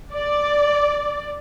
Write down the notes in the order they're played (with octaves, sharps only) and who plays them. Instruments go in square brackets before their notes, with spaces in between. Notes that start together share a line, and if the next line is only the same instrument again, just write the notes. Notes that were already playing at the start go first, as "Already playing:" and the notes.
[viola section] D5